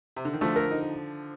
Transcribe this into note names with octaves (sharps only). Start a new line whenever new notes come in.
C3
D3
D#3
D3 F3 A3
A#4
D#4